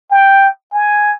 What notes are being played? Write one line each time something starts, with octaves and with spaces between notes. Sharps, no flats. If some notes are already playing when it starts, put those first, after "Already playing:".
G5
G#5